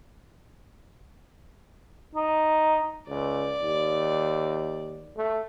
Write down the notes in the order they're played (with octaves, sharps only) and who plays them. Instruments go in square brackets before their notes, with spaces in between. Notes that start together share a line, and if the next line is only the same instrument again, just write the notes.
[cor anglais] D#4
[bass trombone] C#2 [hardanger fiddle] D5
[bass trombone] D#2
A3